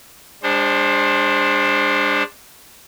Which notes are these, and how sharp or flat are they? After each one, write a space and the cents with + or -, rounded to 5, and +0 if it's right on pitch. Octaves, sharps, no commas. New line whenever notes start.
G#3 -35 D4 +0 C5 +20